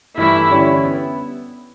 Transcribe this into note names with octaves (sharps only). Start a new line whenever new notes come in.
G2 E3 A3 E4
D3 G3 C#4 E4
B3